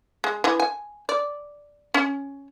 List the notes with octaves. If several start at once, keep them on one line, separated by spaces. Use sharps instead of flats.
G#3
E3
G#5
D5
C#4